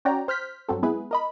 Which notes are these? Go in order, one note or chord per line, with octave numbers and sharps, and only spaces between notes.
C#4 F#4 C#5 D5 G5 A#5
C5 F6 G6 B6
G2 F#3 C4 A4
G#3 B3 E4 G#4 B4
A#4 D#5 B5